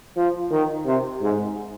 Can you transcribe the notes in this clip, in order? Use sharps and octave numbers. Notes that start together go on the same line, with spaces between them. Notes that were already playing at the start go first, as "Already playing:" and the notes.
F3
D#3
C3
G#2